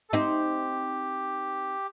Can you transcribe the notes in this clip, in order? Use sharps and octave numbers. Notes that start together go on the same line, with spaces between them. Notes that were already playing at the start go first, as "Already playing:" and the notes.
A4
C4 D#4 G4